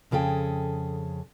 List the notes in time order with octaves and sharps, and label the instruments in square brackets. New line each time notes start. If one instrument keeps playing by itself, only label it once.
[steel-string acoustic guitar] F2 C#3 G#4 A4 G5